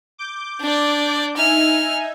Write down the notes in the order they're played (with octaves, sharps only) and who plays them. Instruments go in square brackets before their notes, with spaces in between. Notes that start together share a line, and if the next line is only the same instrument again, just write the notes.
[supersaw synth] D6 G6
[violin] D4 D5
[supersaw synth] D#4 E5 G#5 [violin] F6